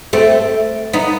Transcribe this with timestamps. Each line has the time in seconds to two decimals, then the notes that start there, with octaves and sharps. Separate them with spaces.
0.13 A3 C4
0.93 B3 D#4